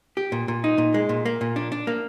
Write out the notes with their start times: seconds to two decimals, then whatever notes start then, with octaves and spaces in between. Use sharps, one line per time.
0.17 G4
0.32 A#2
0.48 A#2
0.64 D#4
0.78 A#2
0.94 G#3
1.09 A#2
1.25 A#3
1.41 A#2
1.56 D4
1.72 D4
1.87 A#3